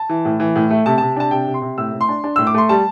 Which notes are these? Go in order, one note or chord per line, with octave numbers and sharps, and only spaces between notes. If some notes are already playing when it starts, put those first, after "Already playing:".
Already playing: A5
E3
A2
E3
A2
A3
C3 A5
C3 A5
D4 A5
C3 G5
C3
C6
C3
A2 E6
A2
C6
D4
D4
A2 E6
D6
A3 C6
G3 A5